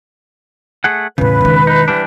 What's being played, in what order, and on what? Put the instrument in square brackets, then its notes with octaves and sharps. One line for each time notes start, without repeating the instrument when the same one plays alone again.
[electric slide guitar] A3 G#4 F#5
[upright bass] E2 A2 [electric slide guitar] C#3 [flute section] B4
[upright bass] E1 D#3
[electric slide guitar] D#4
E3 G3 D4